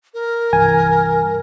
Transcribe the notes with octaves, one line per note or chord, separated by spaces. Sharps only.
A#4
C2 G2 E3 G#5